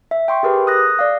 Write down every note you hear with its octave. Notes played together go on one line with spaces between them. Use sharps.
E5
G5 C6 C#6
G4 G#4 A#4 B4
D#6 F#6 A#6
D5 F5